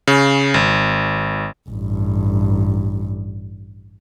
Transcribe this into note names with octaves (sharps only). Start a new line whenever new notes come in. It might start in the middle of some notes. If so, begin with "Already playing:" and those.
C#3
G#1
A1 G2